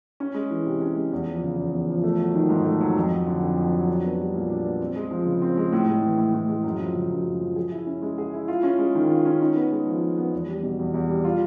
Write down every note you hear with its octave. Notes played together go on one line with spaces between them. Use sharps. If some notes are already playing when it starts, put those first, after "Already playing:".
C#4
G#3
E3
C3
C#4
G#3
E2
F3
C#3
E2
E2
F3
A3
F#3
D#3
G#2
A3
F#3
F2
F#3
D3
F2
F2
F#3
D4
B3
G3
A#2
D4
B3
C4
G#3
F3
C#3
C4
G#3
A2
G#3
E3
A2
A2
G#3
F#2
F3
C#3
F#2
F#2
F3
G#4
E4
C#4
G#3
G#4
E4
F4
C#4
G#3
D#3
F4
C#4
D#4
B3
G#3
F3
D#4
B3
E2
G3
B2
E2
E2
G3
F4